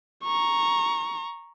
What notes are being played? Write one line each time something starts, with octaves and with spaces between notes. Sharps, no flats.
A#5 C#6